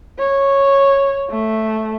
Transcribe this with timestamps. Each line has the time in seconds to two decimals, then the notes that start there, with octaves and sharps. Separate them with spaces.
0.19 C#5
1.30 A3